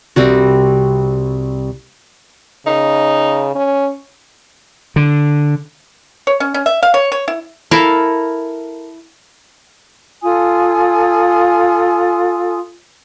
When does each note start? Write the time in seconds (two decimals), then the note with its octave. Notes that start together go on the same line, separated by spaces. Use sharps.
0.16 C2 G3 C4 F#4
2.67 C#3 D#4
3.55 C#4
4.96 D3
6.27 C#5
6.40 C#4
6.54 C#4
6.66 E5
6.83 F5
6.94 C#5
7.12 C#5
7.28 E4
7.71 E4 A4 A#4 F5
10.23 F4 A4 G#5 D#6